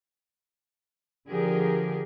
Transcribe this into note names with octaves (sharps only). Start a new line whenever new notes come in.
D3 F3 G4 G#4 A#4